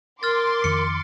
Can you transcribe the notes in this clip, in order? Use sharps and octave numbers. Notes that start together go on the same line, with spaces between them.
A#4 C6 D6 F6 A6
F2 D#3 C#7